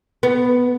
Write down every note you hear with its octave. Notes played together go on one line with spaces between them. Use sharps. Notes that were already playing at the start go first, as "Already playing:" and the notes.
B3